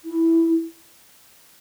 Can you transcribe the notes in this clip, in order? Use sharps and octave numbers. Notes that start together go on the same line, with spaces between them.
E4